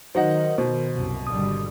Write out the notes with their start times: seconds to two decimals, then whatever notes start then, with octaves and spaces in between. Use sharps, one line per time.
0.15 D#3 F#3 D#4 C5 D#5 F#5
0.58 B2 C5
0.92 C2 F#2
1.27 G#1 D3 G3 D#6